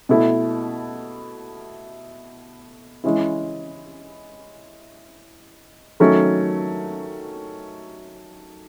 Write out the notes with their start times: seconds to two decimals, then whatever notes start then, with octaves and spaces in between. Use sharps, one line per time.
0.09 B2 A3 E4
3.04 E3 G#3 C#4 E4
6.00 D#3 F#3 A3 C#4